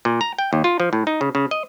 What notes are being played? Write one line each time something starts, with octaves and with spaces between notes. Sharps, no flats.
A#2
A#5
G5
D#2
F4
F3
A2
D#4
C#3
C#3
D#5